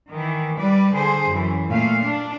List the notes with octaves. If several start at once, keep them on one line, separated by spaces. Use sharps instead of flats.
D#3 E3
G3 B4 D5
D3 G#4 C5
F#2 E3
A#2 A3 F5
D4